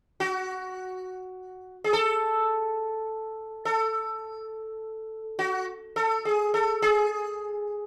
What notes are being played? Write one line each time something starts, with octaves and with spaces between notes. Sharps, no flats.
F#4
G#4
A4
A4
F#4
A4
G#4
A4
G#4